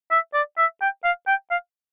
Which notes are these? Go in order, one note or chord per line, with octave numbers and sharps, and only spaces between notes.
E5
D5
E5
G5
F5
G5
F5